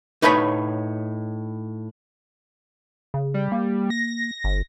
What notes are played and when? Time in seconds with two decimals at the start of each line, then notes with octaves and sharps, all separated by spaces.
0.22 A2 D#4 B4 C#5 G5 B5
3.14 C#3
3.34 G3
3.52 A#3
3.90 A#6
4.44 G1